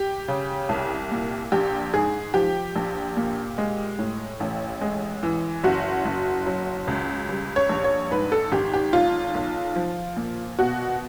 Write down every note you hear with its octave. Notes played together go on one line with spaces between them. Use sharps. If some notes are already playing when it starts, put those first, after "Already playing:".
Already playing: G4
C#3
C2
A#2
A#1 G4
G#2 G#4
F3 G4
A#1
A#2
G#3
A2
A1
G#3
E3
F#1 F#4
F#1
F#3
C#2
G3
C#5
A#1
C#5
G#2 B4
A4
G#1 G4
G4
B1 F4
B1
F3
A#2
B2 F#4